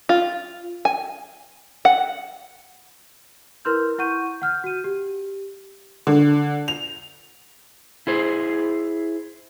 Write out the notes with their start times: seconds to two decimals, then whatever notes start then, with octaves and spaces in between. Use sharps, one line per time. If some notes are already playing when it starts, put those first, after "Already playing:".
0.09 F4
0.85 G#5
1.85 F#5
3.65 E4 A#4 B4 C6 F6 G6
3.98 E4 F#5 C#6 G6 D#7
4.42 F#5 F6 G6
4.64 F#4 D#7
4.84 G4
6.07 D3
6.68 F7
8.07 E4 G#4 C5